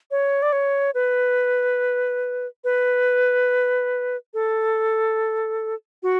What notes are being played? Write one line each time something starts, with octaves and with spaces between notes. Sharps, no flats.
C#5
D5
C#5
B4
B4
A4
F#4